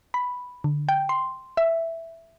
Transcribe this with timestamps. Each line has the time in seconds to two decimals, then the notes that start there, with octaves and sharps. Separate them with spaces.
0.14 B5
0.64 D3
0.89 G5
1.09 C6
1.57 E5